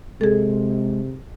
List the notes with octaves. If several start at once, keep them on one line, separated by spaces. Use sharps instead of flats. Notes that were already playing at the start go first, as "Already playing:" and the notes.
C3 G#3 G#4 A4